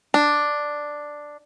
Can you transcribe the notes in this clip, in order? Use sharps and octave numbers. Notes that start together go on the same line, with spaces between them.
D4